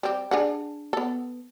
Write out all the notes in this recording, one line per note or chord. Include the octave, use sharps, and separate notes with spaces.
G3 C4
D4 G#4 F#5
B3 A4